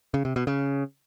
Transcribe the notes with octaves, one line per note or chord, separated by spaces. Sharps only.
C#3
C3
B2
C#3